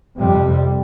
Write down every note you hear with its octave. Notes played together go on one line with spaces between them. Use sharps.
F2 C3 G3